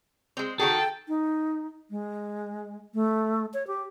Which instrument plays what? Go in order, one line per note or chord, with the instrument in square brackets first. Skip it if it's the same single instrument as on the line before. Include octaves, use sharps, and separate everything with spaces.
[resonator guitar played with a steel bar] G#3 C4
[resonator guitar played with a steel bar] D#3 F#4 G#4 [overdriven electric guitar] A4 [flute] G5
[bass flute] D#4
G#3
A3
C#5
G4